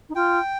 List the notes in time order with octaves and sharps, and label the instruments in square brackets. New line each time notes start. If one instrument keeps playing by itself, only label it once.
[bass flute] D#4
[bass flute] F4 [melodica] G5